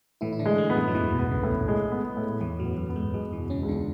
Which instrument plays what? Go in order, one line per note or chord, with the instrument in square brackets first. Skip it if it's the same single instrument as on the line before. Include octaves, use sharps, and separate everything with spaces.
[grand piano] A2 [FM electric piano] E3 E4
[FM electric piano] E4
D3 D4
[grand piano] G#3
[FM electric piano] A2 A3
[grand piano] B3
[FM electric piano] F#2 F#3
F#3
[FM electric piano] E2 E3 [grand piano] B3
[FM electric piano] B1 B2
[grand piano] B3
[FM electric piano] C#2 C#3
[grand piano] A2
G#3
B3
A2
[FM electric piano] E2 E3 [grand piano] A2
[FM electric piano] F#2 F#3
[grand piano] B3
[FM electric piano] F#2 F#3
[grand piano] B3
[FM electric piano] G#2 G#3
[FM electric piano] F#2 F#3 [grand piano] G#3
[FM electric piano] E2 E3
[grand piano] B2
[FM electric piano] C#3 C#4
[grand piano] C#2
[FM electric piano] D3 D4